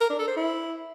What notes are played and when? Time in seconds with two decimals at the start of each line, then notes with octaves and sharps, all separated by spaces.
0.01 A#4
0.10 D4
0.19 A4
0.27 C5
0.36 E4